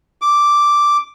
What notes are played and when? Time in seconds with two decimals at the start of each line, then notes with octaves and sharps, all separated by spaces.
0.22 D6